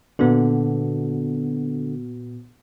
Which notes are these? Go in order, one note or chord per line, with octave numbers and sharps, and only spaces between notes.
A#2 D3 B3 F#4